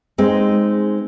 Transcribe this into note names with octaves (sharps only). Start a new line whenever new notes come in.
G#3 C4 D#4